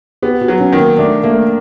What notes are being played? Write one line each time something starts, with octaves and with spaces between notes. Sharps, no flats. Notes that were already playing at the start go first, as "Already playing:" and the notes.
B3 G4
F#4
F#3
C#4
D#3
A#3
A3 D4
A3 A#3